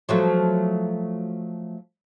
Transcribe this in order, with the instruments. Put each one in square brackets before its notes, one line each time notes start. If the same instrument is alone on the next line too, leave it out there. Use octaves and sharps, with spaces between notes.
[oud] F3 F#3 A3